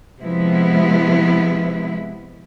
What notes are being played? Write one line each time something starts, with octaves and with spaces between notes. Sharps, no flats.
C3 F3 G#3 B3 E4